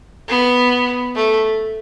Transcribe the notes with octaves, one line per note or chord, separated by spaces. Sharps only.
B3
A3